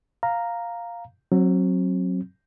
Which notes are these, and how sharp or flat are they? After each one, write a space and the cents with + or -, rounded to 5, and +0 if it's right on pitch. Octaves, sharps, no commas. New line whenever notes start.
F5 +0 A#5 +0
F#3 +0 C4 +35